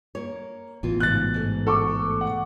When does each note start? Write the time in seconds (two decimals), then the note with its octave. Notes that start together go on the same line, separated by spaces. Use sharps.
0.15 A#3 C#5
0.83 A1 B2 E3 F4
1.00 G#2 C#3 F#6 A6
1.34 G#2 A3
1.67 A4 A5 C#6 D6
2.21 F#5